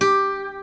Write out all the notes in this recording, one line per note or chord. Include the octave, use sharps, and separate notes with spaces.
G4